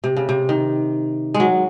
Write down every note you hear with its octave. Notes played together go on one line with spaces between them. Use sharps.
C3
C#3
C3
D#3
G#3
F#3